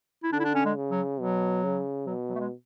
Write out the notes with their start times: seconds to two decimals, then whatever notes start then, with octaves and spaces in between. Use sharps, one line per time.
0.23 E4
0.33 D3 D4
0.40 E4
0.44 D4
0.55 C#4
0.65 G#3
0.77 C#3
0.91 F#3
1.20 B2 F#3
1.64 C#3
2.06 B2 F#3
2.29 F#3
2.35 A3
2.40 G#3